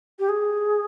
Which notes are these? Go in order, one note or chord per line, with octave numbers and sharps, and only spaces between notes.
G4
G#4